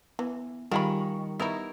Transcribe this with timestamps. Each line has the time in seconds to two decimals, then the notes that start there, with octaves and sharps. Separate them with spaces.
0.19 E3 B3
0.71 D#3 G3 F4 G#4 B5 C#6
1.40 B3 D#4 E4 A#4